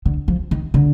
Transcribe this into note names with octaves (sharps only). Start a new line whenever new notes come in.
D3
F3
D#3
D3